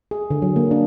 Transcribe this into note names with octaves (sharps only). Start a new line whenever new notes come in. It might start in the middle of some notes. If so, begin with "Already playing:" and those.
G#4
D3
F#3
A#3
D4